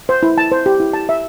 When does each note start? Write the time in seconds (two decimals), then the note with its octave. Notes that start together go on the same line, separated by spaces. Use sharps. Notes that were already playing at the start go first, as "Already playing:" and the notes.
0.09 C5
0.23 E4
0.38 A5
0.52 C5
0.66 G4
0.80 E4
0.93 A5
1.09 E5